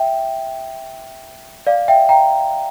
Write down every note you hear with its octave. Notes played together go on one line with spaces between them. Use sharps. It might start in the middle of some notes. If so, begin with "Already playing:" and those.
Already playing: E5 G5
D5 F5
E5 G5
G5 A#5